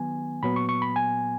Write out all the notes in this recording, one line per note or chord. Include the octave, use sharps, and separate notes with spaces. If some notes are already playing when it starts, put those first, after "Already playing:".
Already playing: D#3 F#3 B3 G#5
A#2 F#3 B3 B5
C#6
C#6
B5
G#5